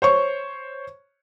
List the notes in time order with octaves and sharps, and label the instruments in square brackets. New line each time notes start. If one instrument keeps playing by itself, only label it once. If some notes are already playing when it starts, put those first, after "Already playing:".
[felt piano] C5 C#5 C#6